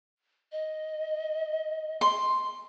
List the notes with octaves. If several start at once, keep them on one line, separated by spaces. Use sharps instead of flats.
D#5
C6